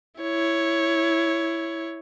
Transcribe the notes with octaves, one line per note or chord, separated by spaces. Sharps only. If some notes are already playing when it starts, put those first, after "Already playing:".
E4 C#5